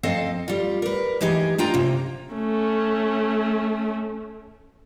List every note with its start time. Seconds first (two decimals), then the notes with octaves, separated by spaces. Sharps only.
0.03 F2 C4 A4 D#5 F5
0.48 G3 F4
0.82 A#4 B4
1.21 E3 G#3 D#4 G4 G#4
1.58 D4 F4 G5 A#5
1.74 C3 A#3
2.34 A3 C#4